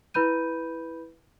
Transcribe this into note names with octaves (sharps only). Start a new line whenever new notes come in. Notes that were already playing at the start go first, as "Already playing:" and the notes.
E4 B4 B5 G6 D#7